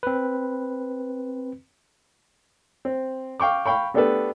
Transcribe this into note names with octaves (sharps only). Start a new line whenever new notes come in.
C4 B4
C4
F5 G5 C#6 D6
F5 G5 B5 C#6
A3 B3 D4 G4 A4 B4